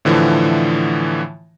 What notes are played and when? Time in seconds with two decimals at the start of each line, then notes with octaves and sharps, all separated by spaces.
0.05 A2 D3 E3 F3